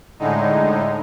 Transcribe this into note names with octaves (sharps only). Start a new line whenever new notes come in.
A2 D3 G#3 D#4